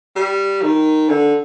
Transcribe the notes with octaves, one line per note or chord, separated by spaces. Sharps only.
G3
D#3
D3